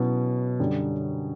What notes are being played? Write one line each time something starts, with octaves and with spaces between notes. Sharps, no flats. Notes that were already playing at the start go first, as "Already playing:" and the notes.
Already playing: B2 F#3 C#4 E4
F#2 D3 G3